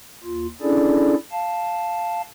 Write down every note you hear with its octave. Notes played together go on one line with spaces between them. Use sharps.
D#2 F4
C#4 D4 E4 G#4 A4 D5
F5 A5